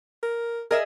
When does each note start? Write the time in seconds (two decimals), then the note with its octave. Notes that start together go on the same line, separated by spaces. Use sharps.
0.23 A#4
0.71 G#4 A#4 D#5 E5